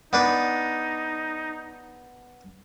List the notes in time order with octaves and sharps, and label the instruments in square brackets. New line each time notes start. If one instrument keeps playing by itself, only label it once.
[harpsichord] B3 D4 B4 [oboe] D#4